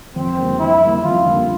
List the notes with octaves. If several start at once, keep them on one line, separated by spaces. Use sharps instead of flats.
F2 C4
D3 G3 A#3
F2 E4
D3 G3 A#3
F2 F4
D3 G3 A#3